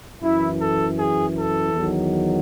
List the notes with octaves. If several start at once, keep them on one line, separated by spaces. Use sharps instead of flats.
F#2 E3 E4
A4
G#4
A4
E2 D#3 F#3